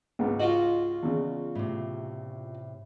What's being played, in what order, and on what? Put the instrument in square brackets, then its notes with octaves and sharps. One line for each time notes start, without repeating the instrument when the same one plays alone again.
[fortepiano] C#2 G#2 B4
[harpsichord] F4 F#4 [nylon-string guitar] D#5
[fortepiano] E2 C#3
[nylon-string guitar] A2 C3